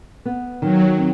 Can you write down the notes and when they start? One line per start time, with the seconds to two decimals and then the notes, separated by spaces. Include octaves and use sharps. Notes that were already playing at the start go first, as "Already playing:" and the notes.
0.25 B3
0.62 D#3 F#3
0.98 C4